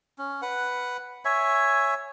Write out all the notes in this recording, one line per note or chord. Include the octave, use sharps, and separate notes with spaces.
C#4
B4 F#5
C#5 E5 G#5